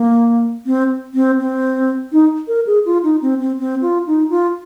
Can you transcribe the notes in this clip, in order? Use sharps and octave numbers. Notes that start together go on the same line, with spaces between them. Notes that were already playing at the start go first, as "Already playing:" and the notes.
Already playing: A#3
C4
C4
C4
D#4
A#4
G#4
F4
D#4
C4
C4
C4
F4
D#4
F4